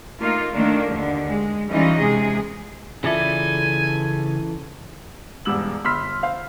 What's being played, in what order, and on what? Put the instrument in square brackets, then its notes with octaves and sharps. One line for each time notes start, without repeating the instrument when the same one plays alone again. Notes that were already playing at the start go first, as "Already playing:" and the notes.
[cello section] A3 A#3 D#4 F4
D#3 A3 A#3 D4
D#2 D3
G#3
E3 G3 C#4 D#4 F4 D#5
C3 G#3 G#4
[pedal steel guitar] C#3 D5 B5 [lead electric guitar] E3 A4 [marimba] F4 E5 [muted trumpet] G#5
[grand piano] E1 G#2 G3 E6 F#7
G1 B5 C6 E6 F6 B6
C5 F5